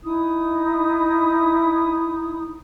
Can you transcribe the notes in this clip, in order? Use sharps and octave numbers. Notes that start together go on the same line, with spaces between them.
D#4 E4 D#6